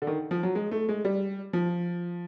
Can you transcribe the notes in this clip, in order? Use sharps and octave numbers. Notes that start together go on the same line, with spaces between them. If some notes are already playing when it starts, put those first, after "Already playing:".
D3
D#3
F3
F#3
G#3
A3
G#3
G3
F3